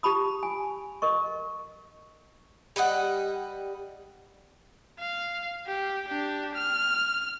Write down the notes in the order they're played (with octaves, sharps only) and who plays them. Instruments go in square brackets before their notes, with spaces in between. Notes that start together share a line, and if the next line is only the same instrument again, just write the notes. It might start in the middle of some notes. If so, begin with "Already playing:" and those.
[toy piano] G4 A5 B5 D#6
G#5
A#4 D#5 C#6
[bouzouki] G3 B4 D#5 F#5
[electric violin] F5
G4
D4 G4
F6